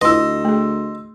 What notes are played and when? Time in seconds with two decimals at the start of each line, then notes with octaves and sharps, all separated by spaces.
0.01 D2 E4 F4 B4 D#5 C6 E6
0.45 A3 G#4